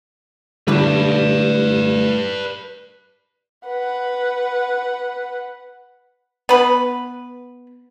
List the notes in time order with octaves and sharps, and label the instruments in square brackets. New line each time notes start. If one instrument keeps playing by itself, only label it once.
[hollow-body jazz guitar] A2 D3 G3 [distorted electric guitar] B4 D5
[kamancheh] B4 F#5
[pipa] B3 B4